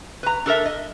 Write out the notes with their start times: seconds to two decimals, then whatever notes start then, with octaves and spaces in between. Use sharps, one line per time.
0.23 B4 A#5
0.46 D4 A4 A#4 E5
0.65 D#5